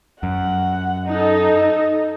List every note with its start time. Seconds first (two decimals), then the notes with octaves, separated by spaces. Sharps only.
0.23 F#2 F#5
1.07 D#4 A4 D#5